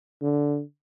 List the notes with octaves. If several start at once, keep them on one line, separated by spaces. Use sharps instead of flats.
D3